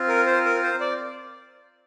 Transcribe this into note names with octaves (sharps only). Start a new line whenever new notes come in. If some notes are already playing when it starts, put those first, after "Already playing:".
Already playing: C4 F4
A#4
C5
A#4
C5
D5